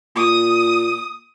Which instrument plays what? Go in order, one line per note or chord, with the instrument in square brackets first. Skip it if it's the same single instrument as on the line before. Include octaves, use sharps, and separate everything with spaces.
[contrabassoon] A#2 [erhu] D#6